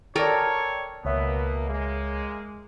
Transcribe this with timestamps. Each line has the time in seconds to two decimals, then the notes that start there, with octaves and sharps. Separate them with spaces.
0.16 A4 A#4 C#5 D5 G5
1.05 C#2 B2 A#3 B3 C#5 E5
1.69 G#3 A#3